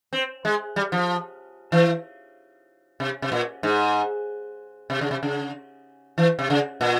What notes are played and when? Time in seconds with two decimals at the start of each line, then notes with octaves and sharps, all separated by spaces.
0.13 C4
0.45 G#3
0.76 G3
0.92 F3
1.72 E3
3.00 C3
3.22 C3
3.32 A#2
3.63 G#2
4.90 C3
5.01 C#3
5.11 C3
5.23 C#3
6.18 E3
6.39 C3
6.50 C#3
6.81 A#2